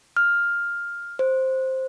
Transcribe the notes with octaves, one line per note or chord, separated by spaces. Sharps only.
F6
C5